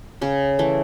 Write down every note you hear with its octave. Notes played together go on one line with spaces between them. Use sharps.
C#3 C#4
E3 A3